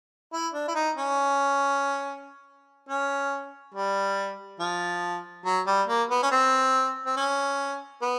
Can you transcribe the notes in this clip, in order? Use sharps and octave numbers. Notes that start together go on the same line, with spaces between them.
E4
D4
E4
D#4
C#4
C#4
G3
F3
F#3
G3
A#3
B3
C#4
C4
C4
C#4
B3